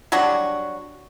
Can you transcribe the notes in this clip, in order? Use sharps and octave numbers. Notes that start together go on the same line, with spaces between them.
F#3 G3 D4 F#4